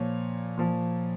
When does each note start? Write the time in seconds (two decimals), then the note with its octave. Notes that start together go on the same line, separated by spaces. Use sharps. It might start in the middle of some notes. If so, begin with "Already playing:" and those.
Already playing: A#2 F3 C#5
0.58 A#2 F3